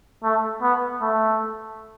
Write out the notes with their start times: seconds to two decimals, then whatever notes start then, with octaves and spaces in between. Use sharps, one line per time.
0.24 A3
0.62 B3
1.02 A3